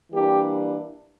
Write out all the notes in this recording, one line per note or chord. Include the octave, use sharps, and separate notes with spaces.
E3 G3 A#3 D4 G4